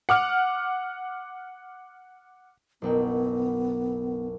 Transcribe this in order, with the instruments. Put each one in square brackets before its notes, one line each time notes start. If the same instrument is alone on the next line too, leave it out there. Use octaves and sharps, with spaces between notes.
[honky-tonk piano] F#5 D6 F6
[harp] F#1 B1 G5 [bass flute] B3